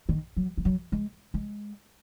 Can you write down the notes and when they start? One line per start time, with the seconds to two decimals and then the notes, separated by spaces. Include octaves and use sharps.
0.09 D#3
0.36 F#3
0.57 F3
0.65 F#3
0.92 G#3
1.34 G#3